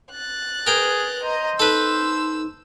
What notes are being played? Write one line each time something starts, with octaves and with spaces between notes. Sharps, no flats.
F#6 A6
G#4 A#4 B4 G5
C5 D#5 A#5
D#4 A4 B4 E6